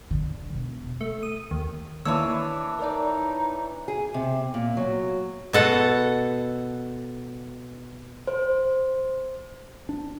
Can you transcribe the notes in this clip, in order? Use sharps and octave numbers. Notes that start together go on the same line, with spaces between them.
D3
E1
A3
D#6
D#2
D#3 E3 A#3 D4 C#5 E6
D#4 A#4 D5
G#4
C3
A#2
F#3
B2 A4 F#5
C5
D4